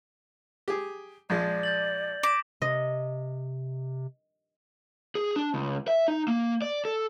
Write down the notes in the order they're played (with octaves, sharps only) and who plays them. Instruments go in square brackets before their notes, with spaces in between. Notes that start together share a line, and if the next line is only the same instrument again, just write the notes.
[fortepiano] G4 G#4
[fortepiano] A#1 F3 G#3 [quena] D5 [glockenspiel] G6 G#6 A#6
[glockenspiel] G6 A6 F#7
[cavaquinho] D6 [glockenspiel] A#6 B6 E7
[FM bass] C3 [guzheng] D#5
[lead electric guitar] G#4
D4
C#2
E5
D#4
A#3
D5
A4